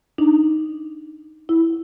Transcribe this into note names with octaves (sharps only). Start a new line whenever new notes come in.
D4 D#4
E4